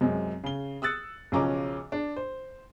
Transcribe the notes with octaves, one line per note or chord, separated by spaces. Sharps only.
F#2 C3 G#3
C#3 G7
D#6 E6 F#6 A6 C#7
B1 C#3 F3 C#4 A#5 D6
D4
C5